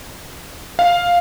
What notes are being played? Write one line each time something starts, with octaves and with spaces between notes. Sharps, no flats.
F5